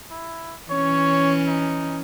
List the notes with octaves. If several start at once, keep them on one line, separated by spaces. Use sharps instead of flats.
E4
E3 C#4 C#5
D#4